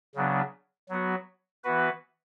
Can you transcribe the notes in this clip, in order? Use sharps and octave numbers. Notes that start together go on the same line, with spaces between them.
C#3 F#3 B3 D4
F#3 B3 F#4
E3 B3 F#4 B4